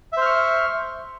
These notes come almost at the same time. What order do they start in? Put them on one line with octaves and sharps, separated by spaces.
E5 C5 F6 C#6